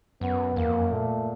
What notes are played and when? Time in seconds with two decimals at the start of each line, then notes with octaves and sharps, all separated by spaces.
0.21 F#2 B3
0.56 E2 A#3
0.68 F2
0.80 F#2
0.92 A#2 A3